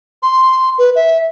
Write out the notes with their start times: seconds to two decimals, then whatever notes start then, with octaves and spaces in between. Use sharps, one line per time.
0.23 C6
0.78 B4
0.96 E5